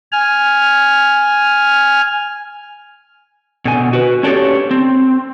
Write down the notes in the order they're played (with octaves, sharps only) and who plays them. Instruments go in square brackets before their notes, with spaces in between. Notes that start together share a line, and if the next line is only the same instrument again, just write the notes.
[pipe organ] G#5 F6
[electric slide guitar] B2 D3 G#5
F#4 B4
C#4 D4 G4 A4 C#5
C4